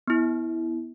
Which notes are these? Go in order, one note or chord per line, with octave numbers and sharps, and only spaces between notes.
B3 E4